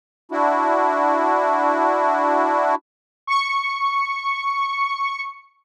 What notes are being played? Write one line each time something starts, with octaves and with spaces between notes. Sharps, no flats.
D4 E4 F#4
C#6 C#7